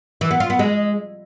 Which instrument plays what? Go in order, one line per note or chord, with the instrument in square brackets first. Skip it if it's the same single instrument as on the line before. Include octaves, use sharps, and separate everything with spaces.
[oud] E3
B3
F4
B3
G#3